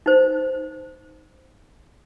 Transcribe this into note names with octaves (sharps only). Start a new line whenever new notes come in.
D#4 C5